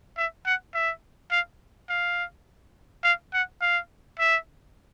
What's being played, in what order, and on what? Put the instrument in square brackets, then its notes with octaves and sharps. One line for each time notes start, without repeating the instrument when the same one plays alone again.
[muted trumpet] E5
F#5
E5
F5
F5
F5
F#5
F5
E5